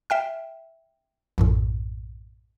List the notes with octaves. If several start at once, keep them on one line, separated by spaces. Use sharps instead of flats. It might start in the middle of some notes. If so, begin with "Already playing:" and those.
E5 G5 F6
A#1 F#2 A2